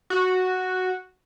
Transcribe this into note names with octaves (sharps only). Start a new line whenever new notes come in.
F#4